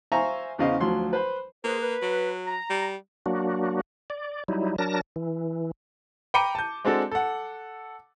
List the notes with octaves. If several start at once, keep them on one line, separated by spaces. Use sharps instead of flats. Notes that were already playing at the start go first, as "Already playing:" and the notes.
C5 E5 F5 G#5 A#5 C#6
E2 C#3 C5 D#5 F5
D2 F3 F#3 C6
B4 C5
A#3 G#4 B4 C5
B4
F#3
A#5
G3
F#3 A#3 D4 F#4
D5
F#3 G3 D#4 E4
F#3 D4 A#4 A5 A#6
E3
G5 A#5 B5 D6 C#7 D#7
A5 G6
G#3 C4 D4 F#4 A4
A4 F#5